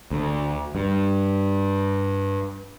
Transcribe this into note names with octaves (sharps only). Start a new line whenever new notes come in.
D2
G2